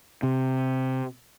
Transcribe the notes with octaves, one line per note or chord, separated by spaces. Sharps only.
C3